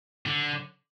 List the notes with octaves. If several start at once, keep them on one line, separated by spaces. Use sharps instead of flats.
D3